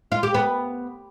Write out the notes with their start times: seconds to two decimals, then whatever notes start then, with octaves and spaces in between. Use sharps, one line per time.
0.12 F4
0.23 G4
0.34 B3